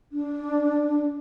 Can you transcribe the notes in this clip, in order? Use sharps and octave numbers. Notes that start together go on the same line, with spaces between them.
D4